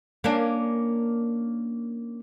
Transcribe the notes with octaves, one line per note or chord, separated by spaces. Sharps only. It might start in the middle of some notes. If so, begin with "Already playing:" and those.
A#3 C#4 D4